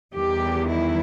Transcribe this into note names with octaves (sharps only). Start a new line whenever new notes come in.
E2 D#3 G3 G4
E4